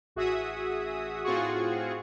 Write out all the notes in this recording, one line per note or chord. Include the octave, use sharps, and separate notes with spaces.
A1 F#4 G#4 E5 D#6
A2 C4 F4 F#4 G#4 C#6